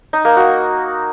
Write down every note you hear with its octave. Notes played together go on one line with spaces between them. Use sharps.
D#4
A#3
F#4